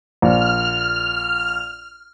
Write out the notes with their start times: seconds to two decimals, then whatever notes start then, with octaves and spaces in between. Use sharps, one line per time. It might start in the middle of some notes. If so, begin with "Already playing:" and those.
0.22 A#1 F6